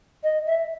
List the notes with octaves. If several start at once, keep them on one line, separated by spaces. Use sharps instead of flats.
D#5
E5